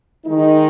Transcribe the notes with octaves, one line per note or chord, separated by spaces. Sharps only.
D#3 G#3 D#4